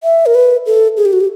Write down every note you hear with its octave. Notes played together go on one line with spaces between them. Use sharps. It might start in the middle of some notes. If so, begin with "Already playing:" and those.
E5
A#4
B4
A4
G#4
G4
F#4
G4